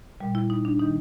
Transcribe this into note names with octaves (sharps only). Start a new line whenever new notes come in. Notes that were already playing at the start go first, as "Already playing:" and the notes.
A#2 G3
E4
D#4
D4
D#3 G3 D#4